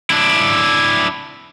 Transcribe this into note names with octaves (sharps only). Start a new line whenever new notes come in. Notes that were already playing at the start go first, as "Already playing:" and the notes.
D4 E4